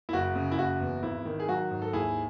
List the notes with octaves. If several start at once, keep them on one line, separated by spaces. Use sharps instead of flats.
E4
F#1 F#4
C#3
E4
F#1 F#4
E2
G#1 E4
D#3
G#4
F#3 F#4
G#2
A4
D#2 E4 G#4